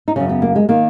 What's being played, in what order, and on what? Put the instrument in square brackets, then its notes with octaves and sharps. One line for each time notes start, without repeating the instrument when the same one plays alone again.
[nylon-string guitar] D#4
F#2 C#3 C#4
B3
A#3
G#3
D#3 A#3